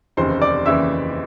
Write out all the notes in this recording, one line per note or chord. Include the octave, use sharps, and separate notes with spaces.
F1 D#2 C#3 E3 C5 C6
D5 D6
F1 D#2 C#3 E3 E5 E6